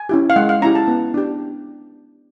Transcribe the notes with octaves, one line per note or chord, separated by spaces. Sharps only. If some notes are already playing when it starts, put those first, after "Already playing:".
Already playing: G#5
C#4 E4 G4
F5
G#3 F#5
F5
C#4 E4 G4 A#5
A5
B3
D4 G4